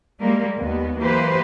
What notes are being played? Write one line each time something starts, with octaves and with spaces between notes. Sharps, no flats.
G3 G#3 A#3
D#2 B3
E3 F#3 A#3 G4 B4 C5